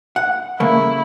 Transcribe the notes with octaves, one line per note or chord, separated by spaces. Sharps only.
F#5
C#3 A3 A#3 E4